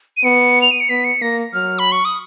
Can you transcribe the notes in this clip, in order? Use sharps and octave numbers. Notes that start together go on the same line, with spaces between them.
D#7
B3 C#7
F7
D#7
C#7
B3 B6
C#7
A#3 A#6
F#3 F6
B5
C#6
D#6